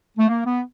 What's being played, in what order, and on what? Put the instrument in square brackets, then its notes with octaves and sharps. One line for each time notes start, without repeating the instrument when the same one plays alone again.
[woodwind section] A3
A#3
B3